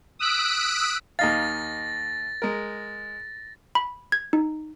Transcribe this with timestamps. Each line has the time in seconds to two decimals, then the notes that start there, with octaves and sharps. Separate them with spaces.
0.19 D#6 E6 F#6 B6 D7
1.19 D#2 D#4 F5 A6 A#6
2.42 G#3 A#4
3.75 B5
4.12 G#6
4.33 D#4